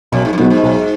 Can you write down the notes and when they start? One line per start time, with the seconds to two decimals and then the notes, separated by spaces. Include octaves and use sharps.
0.12 B1 F#2
0.25 G#2
0.33 F#2
0.38 G#2 B2 F#3 B3
0.50 G#2
0.63 B1